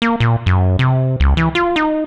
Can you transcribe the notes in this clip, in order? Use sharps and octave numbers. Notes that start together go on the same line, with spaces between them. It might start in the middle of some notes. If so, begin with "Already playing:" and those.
A#3
A#2
F#2
C3
C#2
E3
F4
D#4